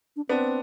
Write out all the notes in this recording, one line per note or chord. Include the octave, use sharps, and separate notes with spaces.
D4
B3 C4 D4